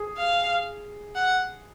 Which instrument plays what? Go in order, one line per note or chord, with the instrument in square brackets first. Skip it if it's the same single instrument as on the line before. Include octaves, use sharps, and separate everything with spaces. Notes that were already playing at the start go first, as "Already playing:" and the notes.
Already playing: [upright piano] G#4
[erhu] F5
F#5